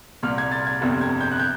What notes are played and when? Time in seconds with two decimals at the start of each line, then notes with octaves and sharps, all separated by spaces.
0.23 C2 A#2 F6
0.38 G#6
0.52 A6
0.67 G#6
0.81 G1 F2 C3
1.01 G#6
1.21 G6
1.32 F#6
1.40 G6